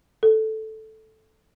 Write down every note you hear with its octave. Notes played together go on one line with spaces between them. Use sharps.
A4